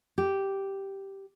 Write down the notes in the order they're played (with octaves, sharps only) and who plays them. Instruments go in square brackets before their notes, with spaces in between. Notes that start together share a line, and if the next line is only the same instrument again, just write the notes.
[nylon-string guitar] G4